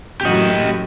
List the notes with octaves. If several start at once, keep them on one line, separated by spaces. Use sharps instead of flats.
F#2 A2 F#4 G4 D#5